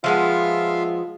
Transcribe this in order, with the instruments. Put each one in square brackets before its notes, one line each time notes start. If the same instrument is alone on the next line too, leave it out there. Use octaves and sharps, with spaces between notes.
[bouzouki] F3 G#3 B3 [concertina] F4 E5 F5